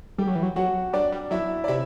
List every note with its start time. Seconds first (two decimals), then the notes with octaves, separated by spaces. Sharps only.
0.18 G3 G4 G5
0.27 F#3
0.35 E3
0.43 F#3
0.56 F#3 F#4 F#5
0.93 G3 D4 D5
1.12 G3
1.31 F#3 E4 E5
1.64 D5
1.68 C3 E4 E5